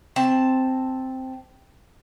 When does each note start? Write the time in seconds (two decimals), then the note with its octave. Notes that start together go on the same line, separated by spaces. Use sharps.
0.16 C4 A5